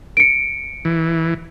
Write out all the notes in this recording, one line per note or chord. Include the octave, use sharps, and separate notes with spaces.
C#7 D7
E3